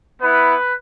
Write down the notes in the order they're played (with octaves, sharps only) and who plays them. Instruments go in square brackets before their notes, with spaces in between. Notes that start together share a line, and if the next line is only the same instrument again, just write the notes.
[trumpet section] B3 E4 B4